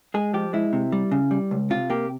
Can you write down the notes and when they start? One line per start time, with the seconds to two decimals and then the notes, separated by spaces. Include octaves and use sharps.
0.14 G#3 G#4
0.34 F3 G4
0.53 G#3 E4
0.73 C3
0.92 G3
1.12 C#3
1.31 G3
1.51 C#2
1.70 C3 F4
1.90 A#3 G4